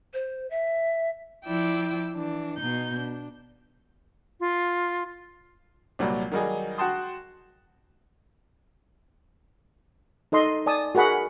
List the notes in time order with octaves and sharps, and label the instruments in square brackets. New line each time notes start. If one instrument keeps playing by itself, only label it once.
[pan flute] C5
E5
[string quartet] F3 E4 D5 G5 E6
E3 D4
B2 D#4 G6
D4
[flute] F4
[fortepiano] C2 A#2 F#3 G3
D#3 F#3 G3 D#4 G#4
F#4 F#5 G5 A5 C6 D#6
[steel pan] D#4 A4 D#5 C6
D5 G#5 A5 D#6
F#4 G#4 A#4 F#5 B5